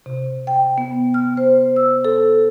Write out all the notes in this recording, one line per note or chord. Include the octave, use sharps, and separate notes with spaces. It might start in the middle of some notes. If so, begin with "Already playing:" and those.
C3
G5
B3
F6
C5
E6
A4